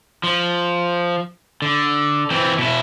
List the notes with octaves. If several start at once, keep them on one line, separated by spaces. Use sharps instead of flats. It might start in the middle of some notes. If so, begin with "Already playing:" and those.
F3
D3
E3 C4
B2 E4